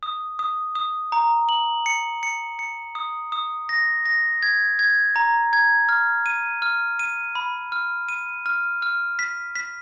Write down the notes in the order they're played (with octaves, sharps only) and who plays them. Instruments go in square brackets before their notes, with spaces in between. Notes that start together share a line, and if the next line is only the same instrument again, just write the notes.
[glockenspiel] D#6
D#6
D#6
A#5
F#7
C#7
C#7
C#7
D#6
D#6
A#6
A#6
G#6
G#6
A#5
G#6
F6
D#7
F6
D#7
B5
F6
D#7
F6
F6
B6
B6